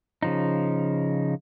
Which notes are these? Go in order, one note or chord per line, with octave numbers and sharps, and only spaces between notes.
C#3 F3 D#4